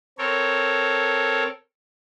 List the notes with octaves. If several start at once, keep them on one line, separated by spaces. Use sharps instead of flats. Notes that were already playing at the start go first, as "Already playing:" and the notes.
C4 A4 A#4 C#5